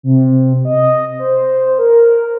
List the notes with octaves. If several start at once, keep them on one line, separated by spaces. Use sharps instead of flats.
C3
D#5
C5
A#4